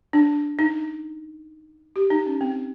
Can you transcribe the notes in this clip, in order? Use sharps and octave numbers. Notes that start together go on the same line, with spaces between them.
D4
D#4
G4
D#4
C#4
C4